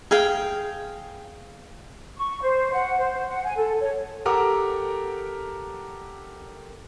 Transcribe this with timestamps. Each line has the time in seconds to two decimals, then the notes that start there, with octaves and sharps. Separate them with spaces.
0.11 G#4 F5 G5
2.17 C#6
2.42 C5
2.73 F#5
2.98 C5
3.29 F#5
3.44 G#5
3.57 A4
3.81 C#5
4.25 G4 A4 A#4 F#5 A#5 D6